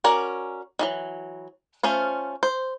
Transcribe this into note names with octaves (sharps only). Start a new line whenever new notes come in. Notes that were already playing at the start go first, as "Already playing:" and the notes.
C#4 F#4 A#4 D5 G#5
D#3 E3 F#3
A3 C#4 F4 C5
C5